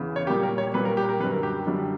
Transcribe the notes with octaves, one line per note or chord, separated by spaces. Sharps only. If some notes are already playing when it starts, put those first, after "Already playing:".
Already playing: E2 C#3 E3
C#5
A#2 G3 A#3 G4
A#4
C#5
A#2 G3 A#3 B4
A#4
G4
A#4
F#2 D3 G3 B4
A#4
G4
F#2 D3 G3